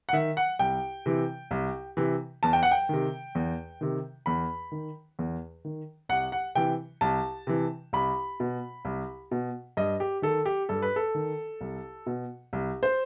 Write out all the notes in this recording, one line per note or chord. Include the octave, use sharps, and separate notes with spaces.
F#5
D#3 E5
F#5
C2 G5
C3 E3
C2
C3 E3
E2 A5
G5
F#5
G5
C3 D#3
E2
C3 D#3
E2 B5
D#3
E2
D#3
C2 F#5
F#5
C3 E3 G5
C2 A5
C3 E3
C2 B5
B2
C2
B2
G2 D#5
G4
D#3 A4
G4
G2 A4
B4
A4
D#3
C2
B2
C2
C5